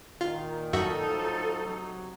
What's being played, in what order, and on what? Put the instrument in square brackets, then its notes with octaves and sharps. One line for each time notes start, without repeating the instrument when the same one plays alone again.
[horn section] A#2 D#3 [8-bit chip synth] F4
[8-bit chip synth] F#2 F#4 E5 [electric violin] D#4 [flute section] A4
[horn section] A2 F3 F#3
C3 F#3